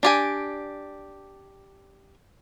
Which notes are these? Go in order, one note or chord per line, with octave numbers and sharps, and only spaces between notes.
D4 G4 G#5